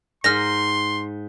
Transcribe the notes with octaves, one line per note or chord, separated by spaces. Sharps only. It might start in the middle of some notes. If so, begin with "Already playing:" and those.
G#2 C6 F6 A#6